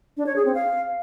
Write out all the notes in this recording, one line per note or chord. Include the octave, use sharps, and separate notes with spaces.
D4
C#5
G#4
C4
F5